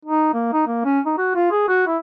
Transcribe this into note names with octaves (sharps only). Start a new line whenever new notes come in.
D#4
A#3
D#4
A#3
C#4
D#4
F#4
F4
G#4
F#4
E4